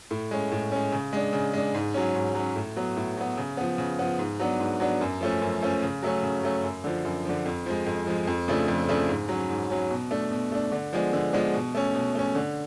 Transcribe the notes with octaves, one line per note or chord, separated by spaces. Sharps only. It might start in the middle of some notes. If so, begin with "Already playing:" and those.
A2
G#3 C#4
A2
G#3 C#4
C#3
G#3 D4
C#3
G#3 D4
G#2
F#3 C#4
G#2
F#3 C#4
A2
F#3 B3
A2
F#3 B3
C#3
F3 B3
C#3
F3 B3
G#2
F#3 B3 D4
G#2
F#3 B3 D4
F#2
F3 A3 C#4
F#2
F3 A3 C#4
C#3
F#3 A3 C#4
C#3
F#3 A3 C#4
F#2
D3 F3
F#2
D3 F3
F2
F3 G#3
F2
F3 G#3
F2
C#3 F3 A3 D4
F2
C#3 F3 A3 D4
G#2
F#3 C#4
G#2
F#3 C#4
B2
A3 D4
B2
A3 D4
D3
F3 G#3 B3 D4
D3
F3 G#3 B3 D4
B2
A3 C#4
B2
A3 C#4
D3